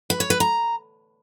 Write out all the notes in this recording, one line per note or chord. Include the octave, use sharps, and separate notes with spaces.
B4
C#5
B4
A#5